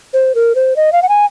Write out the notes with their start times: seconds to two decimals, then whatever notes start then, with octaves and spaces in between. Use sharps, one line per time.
0.14 C5
0.35 A#4
0.55 C5
0.76 D#5
0.93 F5
1.02 F#5
1.09 G#5